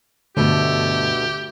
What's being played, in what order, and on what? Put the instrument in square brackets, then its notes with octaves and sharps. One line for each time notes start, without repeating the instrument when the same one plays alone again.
[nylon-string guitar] D2 B2 [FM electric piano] G2 D3 [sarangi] A3 [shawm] G4